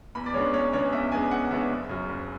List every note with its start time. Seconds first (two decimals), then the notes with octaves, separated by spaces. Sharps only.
0.15 E2 B5
0.26 D5
0.34 C#3 G#3 B3 D4 C#5
0.54 E2 C#5
0.73 C#3 G#3 B3 D4 C#5
0.93 E2 E5
1.12 C#3 G#3 B3 D4 G#5
1.31 E2 F#5
1.50 C#3 G#3 B3 D4 E5
1.70 F#1
1.89 F#2 C#3
2.09 F#1